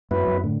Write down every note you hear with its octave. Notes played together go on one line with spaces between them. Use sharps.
F#2 F#3 B3 E4 B4
F#2
A2 D3